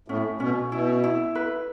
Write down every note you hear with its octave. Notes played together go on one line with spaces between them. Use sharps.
A2 C#4
B2 C#4
B2 E4
E4
B4